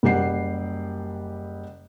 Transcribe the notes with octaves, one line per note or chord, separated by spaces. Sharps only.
F#1 G3 G4 F#5 C7